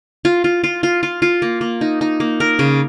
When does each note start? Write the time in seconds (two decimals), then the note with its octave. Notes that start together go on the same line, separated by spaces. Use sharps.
0.25 F4
0.44 F4
0.64 F4
0.83 F4
1.03 F4
1.22 F4
1.42 A#3
1.61 A#3
1.81 D#4
2.01 D#4
2.20 A#3
2.40 A#4
2.59 C#3